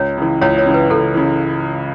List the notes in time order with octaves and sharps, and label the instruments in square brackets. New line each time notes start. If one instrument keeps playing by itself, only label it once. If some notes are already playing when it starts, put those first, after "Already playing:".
Already playing: [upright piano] C#2 [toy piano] C#5
[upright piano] C#3 E3
[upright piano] C#2 [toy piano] C#5
[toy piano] C#5
[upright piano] C#3 E3
[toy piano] B4
[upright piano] C#2 [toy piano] A4
[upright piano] C#3 E3